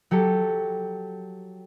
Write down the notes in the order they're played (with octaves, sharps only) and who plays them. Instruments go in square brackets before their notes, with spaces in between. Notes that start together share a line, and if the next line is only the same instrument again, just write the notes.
[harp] F#3 G4 A4